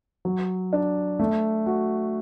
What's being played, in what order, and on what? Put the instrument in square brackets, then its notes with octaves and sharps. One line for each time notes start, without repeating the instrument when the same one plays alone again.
[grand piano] F#3
D4
A3
F#4